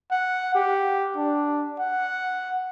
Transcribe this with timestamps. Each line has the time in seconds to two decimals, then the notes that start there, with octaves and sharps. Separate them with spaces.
0.11 F#5
0.55 G4
1.17 D4
1.80 F#5